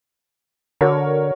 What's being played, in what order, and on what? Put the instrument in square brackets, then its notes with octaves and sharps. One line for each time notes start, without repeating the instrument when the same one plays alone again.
[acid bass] D3 [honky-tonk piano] F#4 A#4 C#5